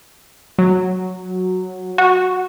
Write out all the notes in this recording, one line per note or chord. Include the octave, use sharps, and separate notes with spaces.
F#3
F#4